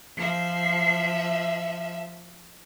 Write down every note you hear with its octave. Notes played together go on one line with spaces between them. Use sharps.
F3 E5